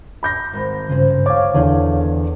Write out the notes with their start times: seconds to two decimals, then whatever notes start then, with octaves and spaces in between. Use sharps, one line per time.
0.23 B5 G6 A#6
0.53 G#1
0.89 G2 C#3 F4 G#4 C5
1.26 C#5 F5 G#5 D6 G#6 A6
1.54 E2 D3 G#4 G6